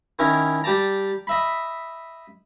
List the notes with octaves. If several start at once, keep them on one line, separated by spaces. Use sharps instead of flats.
D#3 C#4 E4 A#4
G3 G4 D5 A5 A#5
D#5 E5 B5